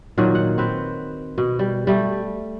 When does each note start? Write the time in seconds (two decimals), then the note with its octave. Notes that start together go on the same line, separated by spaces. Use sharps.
0.18 A#2 D#3 F#3 F#4
0.35 F#5
0.58 C4 B4
1.38 B2
1.59 G3
1.87 G3 A3